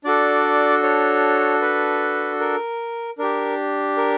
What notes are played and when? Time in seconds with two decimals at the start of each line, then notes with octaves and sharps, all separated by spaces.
0.04 D4 F#4 A4 D5
0.83 C#5
1.61 B4
2.40 A#4
3.18 D4 G4 A#4
3.97 A#4